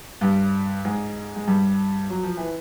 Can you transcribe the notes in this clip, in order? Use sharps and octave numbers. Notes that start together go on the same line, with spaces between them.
G2 G3
G#2 G#3
G#3
G2 G3
F#3
F3
E3